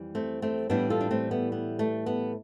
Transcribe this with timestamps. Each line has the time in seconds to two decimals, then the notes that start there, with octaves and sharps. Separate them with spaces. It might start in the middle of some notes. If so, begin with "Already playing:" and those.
Already playing: F2 E3 G3
0.15 A3 C4
0.42 A3 C4
0.70 A2 E3 G3 B3 D4
0.90 F4 A4
1.01 D4
1.11 A3 C4
1.31 B3
1.52 B3
1.79 A3
2.06 B3